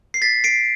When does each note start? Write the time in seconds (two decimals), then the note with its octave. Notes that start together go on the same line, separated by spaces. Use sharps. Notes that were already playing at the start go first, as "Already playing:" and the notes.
0.14 C7
0.22 A6 B6
0.44 C7 D7